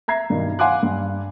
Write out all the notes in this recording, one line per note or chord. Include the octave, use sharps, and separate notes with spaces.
E5 A#5 G#6 C7
G2 B2 D#3
F5 F#5 G#5 C6 D6 F#6
G2